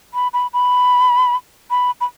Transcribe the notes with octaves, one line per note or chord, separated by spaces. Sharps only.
B5
B5
B5
B5
B5